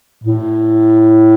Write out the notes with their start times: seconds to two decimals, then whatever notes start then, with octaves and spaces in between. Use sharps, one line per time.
0.24 A2